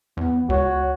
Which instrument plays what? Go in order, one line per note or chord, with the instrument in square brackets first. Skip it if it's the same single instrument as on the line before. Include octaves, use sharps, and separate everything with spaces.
[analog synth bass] E2 [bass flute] B3
[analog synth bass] C#2 [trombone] F#4 [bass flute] C#5